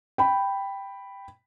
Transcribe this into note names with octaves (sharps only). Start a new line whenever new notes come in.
G5 B5